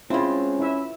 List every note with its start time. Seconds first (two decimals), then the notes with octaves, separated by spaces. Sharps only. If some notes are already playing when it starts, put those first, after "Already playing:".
0.10 G#3 C4 C#4 E4 F4
0.59 E4 E5